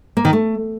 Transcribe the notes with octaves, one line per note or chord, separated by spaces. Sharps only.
A#3
D#3
A3